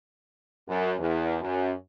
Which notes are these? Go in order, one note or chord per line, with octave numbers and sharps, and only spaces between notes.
F#2
E2
F#2